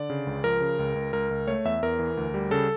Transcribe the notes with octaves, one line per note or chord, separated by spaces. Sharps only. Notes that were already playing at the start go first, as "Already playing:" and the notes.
Already playing: D3 D5
C#3
C#2
F3 A#4
C#3
C#2
C#2
C#2 A#4
C#2
A3 C#5
E2 E5
E2 A#4
E3
D2
G3
C#3 A4